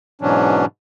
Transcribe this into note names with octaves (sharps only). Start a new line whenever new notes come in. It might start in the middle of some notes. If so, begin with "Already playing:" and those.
G#2 B2 E3 F#3 C#4 D4